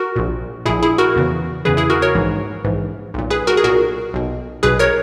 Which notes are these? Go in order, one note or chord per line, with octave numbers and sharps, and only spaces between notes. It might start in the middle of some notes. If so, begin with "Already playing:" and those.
Already playing: F#4 A#4
A#1 A#2
A#1 A#2 E4 G#4
E4 G#4
F#4 A#4
E2 C#3 E3
E2 C#3 E3 G#4 B4
E4 G#4
F#4 A#4
A#4 C#5
A#1 G#2 E3
A#1 G#2 E3
B1 A#2
G#4 B4
F#4 A#4
G#4
B1 A#2 F#4 A#4
B1 B2
B1 B2 G#4 B4
A#4 C#5